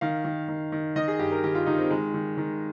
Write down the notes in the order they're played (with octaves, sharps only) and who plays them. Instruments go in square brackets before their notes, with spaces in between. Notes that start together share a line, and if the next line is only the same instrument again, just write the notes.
[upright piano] D#3 F5
D#3
D#3
D#3
D#3 D#5
G#4
G2 G4
A#4
D#3 G4
F4
D#3 D#4
C4
D#3 G#3
D#3
D#3